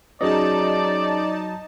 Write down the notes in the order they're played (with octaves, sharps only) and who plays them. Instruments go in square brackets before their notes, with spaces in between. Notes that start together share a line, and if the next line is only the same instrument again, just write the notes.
[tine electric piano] F#3 D#5 [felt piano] C#4 F#4 G#4 [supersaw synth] D#4 A5 [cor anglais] D5